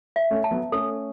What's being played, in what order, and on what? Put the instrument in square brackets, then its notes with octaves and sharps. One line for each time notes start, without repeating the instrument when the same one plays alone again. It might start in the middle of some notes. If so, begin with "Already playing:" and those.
[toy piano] E5
[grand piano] A3 C#4
[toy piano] A5
[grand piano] F#3 B3
[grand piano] A3 C#4 [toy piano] A4